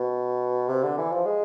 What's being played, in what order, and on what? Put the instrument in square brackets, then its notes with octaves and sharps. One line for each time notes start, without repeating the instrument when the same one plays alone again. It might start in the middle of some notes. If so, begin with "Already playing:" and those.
Already playing: [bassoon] B2
C3
D3
E3
F3
G#3